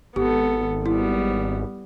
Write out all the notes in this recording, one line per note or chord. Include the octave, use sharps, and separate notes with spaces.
G#1 B3 G4 A4
G3 B3 E4